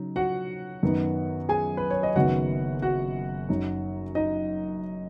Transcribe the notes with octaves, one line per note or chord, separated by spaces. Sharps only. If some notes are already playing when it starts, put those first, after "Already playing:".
Already playing: C#3 F#3 D#4
F#4 F#5
F#2 D#3 B3 D#4
G#4 G#5
B4
C#5
D#5
F#1 F#2 D#3 B3 F#4 F#5
F#4 F#5
F#2 F#3 D#4
D#4 D#5